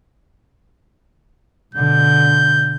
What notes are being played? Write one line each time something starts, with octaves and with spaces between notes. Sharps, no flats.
B2 D3 G6